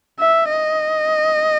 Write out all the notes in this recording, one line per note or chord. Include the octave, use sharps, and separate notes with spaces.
E5
D#5